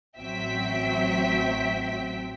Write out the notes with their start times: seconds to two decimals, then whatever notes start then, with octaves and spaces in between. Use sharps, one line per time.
0.17 A1 F#3 C4 E5 G5 B6